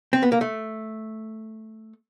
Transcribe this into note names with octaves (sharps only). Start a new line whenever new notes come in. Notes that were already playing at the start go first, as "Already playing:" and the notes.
C4
B3
A#3
A3